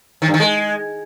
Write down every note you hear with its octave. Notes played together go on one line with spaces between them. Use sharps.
D#3
G2
D#3
G#3